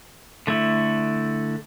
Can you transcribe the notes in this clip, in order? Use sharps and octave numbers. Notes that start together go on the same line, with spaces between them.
D3 A3 E4